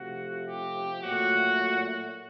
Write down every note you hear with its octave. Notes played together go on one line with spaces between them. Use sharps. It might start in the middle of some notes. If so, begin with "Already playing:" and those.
Already playing: C3 F3 A3 F#4
G4
A#2 F#3 A3 F#4